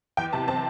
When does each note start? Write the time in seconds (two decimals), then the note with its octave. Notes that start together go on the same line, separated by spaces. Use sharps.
0.17 E2 G5
0.33 C3 A5
0.48 C4 A5